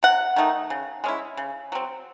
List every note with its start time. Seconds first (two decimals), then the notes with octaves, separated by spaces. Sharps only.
0.03 C3 F#5
0.36 D#3 A3 D#4
0.70 C#3
1.04 G#3 C#4 E4
1.37 C#3
1.72 F#3 C4